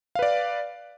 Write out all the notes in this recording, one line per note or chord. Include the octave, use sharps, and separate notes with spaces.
B4 D5 F5